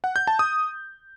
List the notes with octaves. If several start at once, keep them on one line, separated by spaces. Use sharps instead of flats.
F#5
G6
A5
D#6